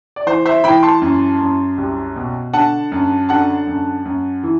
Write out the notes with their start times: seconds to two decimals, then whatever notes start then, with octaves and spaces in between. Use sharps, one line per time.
0.16 D5
0.26 E3 C5
0.45 C5 E5
0.64 E3 G5 B5
0.83 A5 C6
1.02 F#2
1.40 F#2
1.78 C2
2.16 B2
2.53 D3 F#5 A5
2.92 F#2
3.29 D3 F#5 A5
3.67 F#2
4.05 F#2
4.44 E3